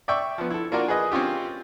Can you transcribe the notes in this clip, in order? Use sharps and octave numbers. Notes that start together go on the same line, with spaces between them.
D5 E5 G5 C#6
F3 B3
E4 A4
A#3 D4 F4 F#4 A#4
G#4 B4 D#5
C4 C#4 F4 G4